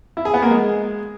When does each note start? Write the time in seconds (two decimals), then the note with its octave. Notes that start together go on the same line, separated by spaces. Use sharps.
0.17 E4
0.25 G#4
0.34 B3
0.42 A#3
0.51 G#3